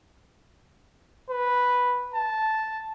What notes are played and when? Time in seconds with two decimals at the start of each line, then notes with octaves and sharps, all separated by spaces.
1.30 B4
2.15 A5